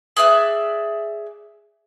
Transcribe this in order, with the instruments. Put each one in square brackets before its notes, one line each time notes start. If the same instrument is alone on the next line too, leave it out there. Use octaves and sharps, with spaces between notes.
[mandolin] G#4 D5 E5 F#6